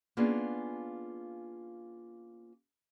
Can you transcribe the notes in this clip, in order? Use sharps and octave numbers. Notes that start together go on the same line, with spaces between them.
A#3 B3 C#4 D4 F4 G#4